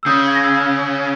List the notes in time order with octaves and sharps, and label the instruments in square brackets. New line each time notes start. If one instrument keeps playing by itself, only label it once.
[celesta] E6
[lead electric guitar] C#3 [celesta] D#6 G6
[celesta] G#6
A#6
E6 G#6